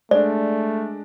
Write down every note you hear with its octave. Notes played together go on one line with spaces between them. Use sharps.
G#3 A3 D4 D5